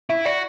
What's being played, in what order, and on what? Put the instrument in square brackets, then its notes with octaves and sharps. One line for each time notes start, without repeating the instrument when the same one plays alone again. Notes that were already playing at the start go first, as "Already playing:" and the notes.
[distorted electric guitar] E4 [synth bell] E5
[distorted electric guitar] F#4 [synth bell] D5